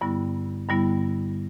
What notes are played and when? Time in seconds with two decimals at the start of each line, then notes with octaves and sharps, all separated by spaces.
0.01 G2 D3 G3 B3 E4
0.69 G2 D3 G3 B3 E4